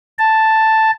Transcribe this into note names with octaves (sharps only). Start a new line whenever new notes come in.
A5